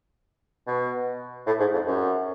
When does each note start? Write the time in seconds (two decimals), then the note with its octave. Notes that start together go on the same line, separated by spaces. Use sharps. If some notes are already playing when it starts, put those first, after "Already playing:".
0.67 B2
1.46 A2
1.59 G#2
1.73 F2
1.87 F#2